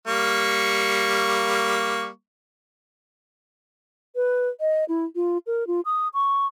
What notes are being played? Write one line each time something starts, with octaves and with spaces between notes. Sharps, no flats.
G3 A#3 C#6
B4
D#5
E4
F4
A#4
F4
D#6
C#6